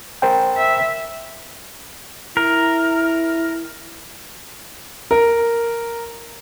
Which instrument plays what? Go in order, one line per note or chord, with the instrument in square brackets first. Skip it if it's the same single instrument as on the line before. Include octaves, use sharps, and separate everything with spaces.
[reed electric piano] A#4 C5 G5
[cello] E5
[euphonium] E4 [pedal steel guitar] A#4
[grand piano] A#4